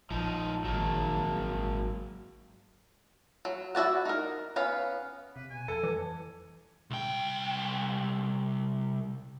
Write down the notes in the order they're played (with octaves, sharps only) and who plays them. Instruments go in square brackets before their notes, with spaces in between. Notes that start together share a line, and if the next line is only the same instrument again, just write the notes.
[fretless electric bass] A#1 [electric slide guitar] F3 D#4 [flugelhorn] A5
[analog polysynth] G#1 [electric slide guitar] F#3 A#3
[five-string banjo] F#3
E4 F#4 D5 F#5
D#4 A#4
B3 C#4 F5
[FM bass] C3 [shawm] B4
[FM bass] B2 [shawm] G#5
[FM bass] F2 [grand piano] A4
[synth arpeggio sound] E3
[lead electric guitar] C2 G5